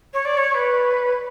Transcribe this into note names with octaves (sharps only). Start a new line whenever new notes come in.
C#5
D5
C#5
C#5
B4